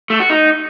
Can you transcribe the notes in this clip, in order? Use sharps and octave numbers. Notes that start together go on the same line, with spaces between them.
A3
F#4
D#4